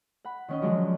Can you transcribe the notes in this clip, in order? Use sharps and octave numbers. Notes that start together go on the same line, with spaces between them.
F#5 B5
D#3 C#4 D#5
D3 F3 F#3 G#3